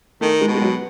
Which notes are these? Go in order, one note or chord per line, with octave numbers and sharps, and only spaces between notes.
D#3 A3
G#3
B2
G#3
F#3